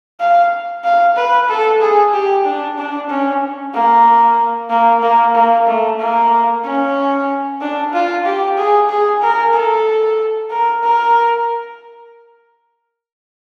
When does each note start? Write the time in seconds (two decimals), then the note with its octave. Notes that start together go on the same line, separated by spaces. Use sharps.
0.20 F5
0.84 F5
1.16 B4
1.48 A4
1.80 G#4
2.13 G4
2.45 D4
2.78 D4
3.09 C#4
3.74 A#3
4.70 A#3
5.02 A#3
5.35 A#3
5.67 A3
5.99 A#3
6.64 C#4
7.61 D4
7.93 F4
8.25 G4
8.57 G#4
8.89 G#4
9.21 A#4
9.53 A4
10.51 A#4
10.83 A#4